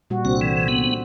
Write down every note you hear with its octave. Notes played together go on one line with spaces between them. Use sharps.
A#2 G3 F#4
C2 D3 C4 F#4
E3
B3